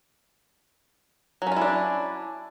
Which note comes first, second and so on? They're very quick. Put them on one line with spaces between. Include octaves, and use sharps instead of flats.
F#3 C#4 F4 E4 D4